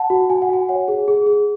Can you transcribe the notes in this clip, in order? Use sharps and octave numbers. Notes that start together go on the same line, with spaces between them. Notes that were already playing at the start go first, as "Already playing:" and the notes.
Already playing: F#5 A5
F#4
F#4 G#5
F#5
F#4 G#5
C#5 F#5
G#4
G#4
G#4